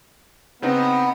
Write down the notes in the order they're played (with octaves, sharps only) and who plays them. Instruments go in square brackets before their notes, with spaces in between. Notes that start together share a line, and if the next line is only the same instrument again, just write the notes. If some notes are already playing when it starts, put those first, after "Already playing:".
[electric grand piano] C#3 C4 D#4 [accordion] B3